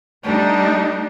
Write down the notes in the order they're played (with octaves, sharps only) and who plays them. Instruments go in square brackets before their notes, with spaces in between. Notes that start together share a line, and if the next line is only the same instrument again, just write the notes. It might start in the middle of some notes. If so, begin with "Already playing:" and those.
[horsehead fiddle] G3 D4 [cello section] A3 D#4